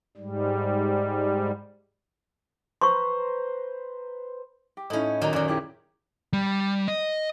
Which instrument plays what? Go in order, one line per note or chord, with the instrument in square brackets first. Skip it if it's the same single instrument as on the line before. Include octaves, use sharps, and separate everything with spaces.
[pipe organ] G#2 G3
[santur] B4 C5 A#5 [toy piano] C6 C#6
[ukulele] G4
[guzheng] A2 C#4 [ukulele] D#4 E4 D#5
[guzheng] A#2 D#3 F#3 [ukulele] D5 D#5 A#5
[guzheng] F#2 D#3 [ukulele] F#4 D5
[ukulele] E4 G4 G#4
[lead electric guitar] G3
D#5